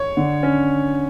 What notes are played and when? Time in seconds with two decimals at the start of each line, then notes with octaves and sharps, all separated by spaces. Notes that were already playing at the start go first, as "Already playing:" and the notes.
Already playing: C#5
0.17 D3
0.43 C#4